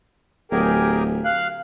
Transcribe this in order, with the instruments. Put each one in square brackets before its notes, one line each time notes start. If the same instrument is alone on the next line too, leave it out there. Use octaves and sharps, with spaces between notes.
[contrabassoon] D1 [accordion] G4 G#4 A#4
[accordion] F5 F#6